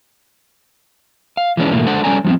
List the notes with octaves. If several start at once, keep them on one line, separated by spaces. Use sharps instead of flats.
F5
E3 F3 G#3 B3 C#4 D4
G#2 B2 E3 A3 A#3
G#3 D4 A4 C5 D5 F#5
G3 C#4 A4 D5 G#5 A#5
F3 G3 A3 B3 C4